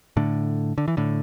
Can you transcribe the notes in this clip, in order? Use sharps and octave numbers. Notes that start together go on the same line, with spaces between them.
A2 D3
D3
E3
A2 D3